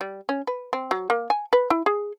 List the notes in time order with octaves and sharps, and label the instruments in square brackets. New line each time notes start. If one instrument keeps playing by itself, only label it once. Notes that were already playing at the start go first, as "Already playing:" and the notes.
[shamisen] G3
C#4
B4
C4
F#3
A#3
G#5
B4
E4
G#4